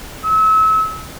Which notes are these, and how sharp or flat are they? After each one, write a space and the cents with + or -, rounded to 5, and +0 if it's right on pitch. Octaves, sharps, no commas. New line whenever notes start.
E6 -35